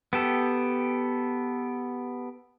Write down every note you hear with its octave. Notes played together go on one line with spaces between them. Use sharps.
B3 G4 A4